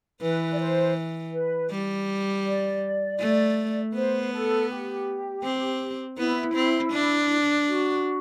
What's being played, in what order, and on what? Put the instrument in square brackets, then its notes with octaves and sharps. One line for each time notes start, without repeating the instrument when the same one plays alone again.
[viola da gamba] E3 [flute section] B4
[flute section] D5
C5
B4
[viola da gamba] G3
[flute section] D5
[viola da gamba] A3
[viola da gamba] B3 [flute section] C5
[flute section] A4
G4
[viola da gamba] C4
[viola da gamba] B3 [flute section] E4
[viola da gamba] C4
D4
[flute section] F#4